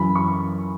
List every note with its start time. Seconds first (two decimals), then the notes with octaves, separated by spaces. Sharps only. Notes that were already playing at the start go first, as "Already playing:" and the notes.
Already playing: F#2 E3 B5
0.16 C#6